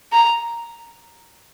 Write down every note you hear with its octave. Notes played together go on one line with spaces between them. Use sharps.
A#5